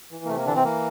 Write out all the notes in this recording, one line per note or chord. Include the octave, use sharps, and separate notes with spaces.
E3
A#3
C3 A3
A#3
D3 E3 D4
C3 C4
E3 A#3